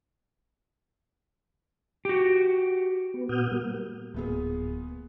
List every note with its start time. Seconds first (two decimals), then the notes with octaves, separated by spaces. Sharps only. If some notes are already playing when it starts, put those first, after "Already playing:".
2.05 F#4 G4
3.14 B3
3.29 A#2 B3 F#4 D#6 F6 G6
3.51 G3 A#3
4.14 D1 A#2 B3 G#4